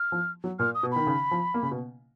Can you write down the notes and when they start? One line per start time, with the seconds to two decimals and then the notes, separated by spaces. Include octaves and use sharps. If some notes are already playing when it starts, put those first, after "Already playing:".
Already playing: F6
0.12 F3
0.44 F#3
0.59 A#2 F6
0.74 D#6
0.83 B2
0.92 D#3 B5
1.07 C#3
1.31 F3
1.54 A#3
1.63 C#3
1.71 B2